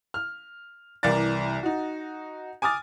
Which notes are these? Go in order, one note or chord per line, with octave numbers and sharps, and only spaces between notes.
F6
C2 E3 A#4 D5 A6
D#4 F#4
G#5 D6 D#6 F6 A6